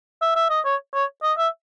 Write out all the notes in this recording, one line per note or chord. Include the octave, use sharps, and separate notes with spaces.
E5
E5
D#5
C#5
C#5
D#5
E5